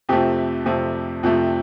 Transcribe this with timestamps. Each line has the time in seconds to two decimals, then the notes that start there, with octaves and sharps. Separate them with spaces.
0.09 F2 C3 F3 A3 G4
0.66 F2 C3 F3 A3
1.23 F2 C3 F3 A3